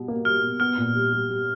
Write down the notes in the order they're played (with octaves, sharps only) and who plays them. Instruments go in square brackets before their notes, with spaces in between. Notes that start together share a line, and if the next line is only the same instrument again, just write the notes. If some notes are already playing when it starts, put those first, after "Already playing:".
Already playing: [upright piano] B2 G3
A#3
[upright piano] G3 [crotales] F6
[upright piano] B2
[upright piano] B3 [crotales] F6
[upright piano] A#2
G3
G3
G3